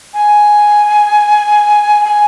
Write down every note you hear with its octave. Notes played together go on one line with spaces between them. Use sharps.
G#5
G#5